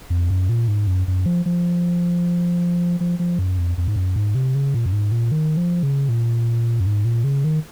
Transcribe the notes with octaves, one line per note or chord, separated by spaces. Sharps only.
F2
F#2
A#2
G#2
F#2
F#2
F3
F3
F3
F3
F#2
F2
F2
G#2
F#2
G#2
C3
C#3
A#2
F#2
G#2
A#2
D#3
F3
C#3
A#2
F#2
G#2
A#2
C#3
D#3